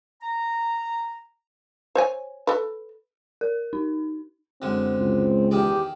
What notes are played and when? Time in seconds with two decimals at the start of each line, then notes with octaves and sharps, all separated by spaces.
0.22 A#5
1.95 C5 C#5 G#5
2.47 A4 B4
3.41 A#4
3.73 D#4
4.62 F#2 D3 G#3 C4
4.99 C#2
5.51 E2 D#3 G4 G#4 D5